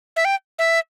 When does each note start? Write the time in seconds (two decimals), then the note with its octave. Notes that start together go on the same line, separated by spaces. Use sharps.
0.16 E5
0.25 G5
0.59 E5